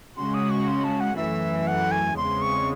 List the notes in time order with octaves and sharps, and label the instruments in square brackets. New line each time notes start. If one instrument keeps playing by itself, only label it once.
[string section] C#3 G#3 C#4 F#4 [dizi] C6
[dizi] D#6
C#6
C6
A5
F#5
[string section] F#2 E3 A3 [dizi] E5
[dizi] F#5
G#5
[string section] E2 C#3 G#3 C4 [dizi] C6
[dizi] C#6